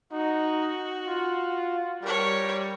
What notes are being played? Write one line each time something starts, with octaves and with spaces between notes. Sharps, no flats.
D#4 F#4
F4
G3 A#4 C#5